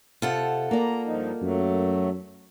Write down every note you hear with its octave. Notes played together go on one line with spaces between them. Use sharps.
C3 F4 A4 F#5
A#3 D5 A#5
G2 F3 D#4
F#2 F#3 A3